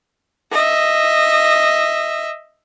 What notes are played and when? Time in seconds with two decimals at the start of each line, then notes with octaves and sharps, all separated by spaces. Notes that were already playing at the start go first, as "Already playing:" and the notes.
0.52 D#5 E5